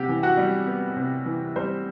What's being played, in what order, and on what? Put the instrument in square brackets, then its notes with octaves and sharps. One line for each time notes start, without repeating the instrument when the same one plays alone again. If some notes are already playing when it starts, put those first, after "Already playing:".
Already playing: [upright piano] C3 G4 F#5
E3
F#4 F#5
G3
B3
C3
E3
G3 C5